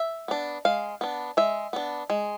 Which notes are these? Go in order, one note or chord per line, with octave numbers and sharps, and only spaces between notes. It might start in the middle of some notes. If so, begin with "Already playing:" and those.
Already playing: E5
B3 D4
G#3 F5
B3 D4
G#3 E5
B3 D4
G#3